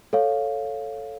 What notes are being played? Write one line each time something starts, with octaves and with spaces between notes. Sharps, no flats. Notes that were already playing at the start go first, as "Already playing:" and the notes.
A4 C#5 F5